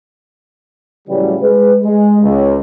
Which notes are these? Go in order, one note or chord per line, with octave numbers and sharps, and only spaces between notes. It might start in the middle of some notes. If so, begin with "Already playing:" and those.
A2 C#3 E3 F#3 G3
G#3 B4
G#3
C#2